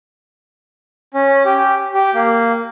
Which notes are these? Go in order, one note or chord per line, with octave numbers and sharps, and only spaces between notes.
C#4
G4
G4
A#3